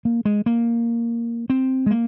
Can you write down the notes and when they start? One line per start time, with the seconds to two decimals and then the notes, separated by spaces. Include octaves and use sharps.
0.05 A#3
0.25 G#3
0.46 A#3
1.50 C4
1.86 G#3
1.91 A#3